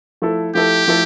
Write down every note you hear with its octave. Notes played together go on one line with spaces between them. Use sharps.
F3 A3 E4 A4
F3 A3 E4 G4 A4
F3 A3 E4 A4